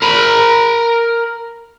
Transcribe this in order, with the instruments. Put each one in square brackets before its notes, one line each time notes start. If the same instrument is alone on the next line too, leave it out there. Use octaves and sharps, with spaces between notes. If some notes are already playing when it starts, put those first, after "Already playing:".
[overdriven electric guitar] A#4 B5